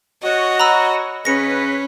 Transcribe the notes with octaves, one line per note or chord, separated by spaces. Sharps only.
F#4 C#5 D#5
A#5 B5 E6
C#3 C#4 B4 A#6 C#7